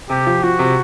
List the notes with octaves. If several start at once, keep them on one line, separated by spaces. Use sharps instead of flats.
C3 G4
F3
F3 F#4
C3